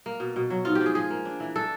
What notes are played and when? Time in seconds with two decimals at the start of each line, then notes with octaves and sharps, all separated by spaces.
0.06 A#3
0.20 B2
0.36 B2
0.50 F#3
0.65 G#2 F4
0.75 G4
0.81 F3 G#4
0.95 F3 G#4
1.11 A#3
1.25 D4
1.40 E3
1.55 D4 A4